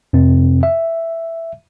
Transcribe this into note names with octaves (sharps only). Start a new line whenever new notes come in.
F2 C3 C4
E5